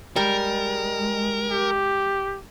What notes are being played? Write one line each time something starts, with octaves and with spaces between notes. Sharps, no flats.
G3 G#3 A#4
G4